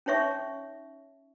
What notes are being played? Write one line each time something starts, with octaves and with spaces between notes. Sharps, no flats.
C#4 D#4 C#5 E5 C#6